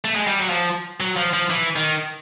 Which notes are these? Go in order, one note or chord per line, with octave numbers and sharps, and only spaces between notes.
A3
G#3
G3
F#3
F3
F#3
F3
F3
E3
D#3